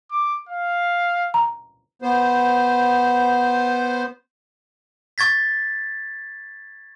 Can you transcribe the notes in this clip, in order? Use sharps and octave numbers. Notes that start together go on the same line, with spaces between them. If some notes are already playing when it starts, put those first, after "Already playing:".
D6
F5
A#5
B3 C5
C#6 G#6 A6 B6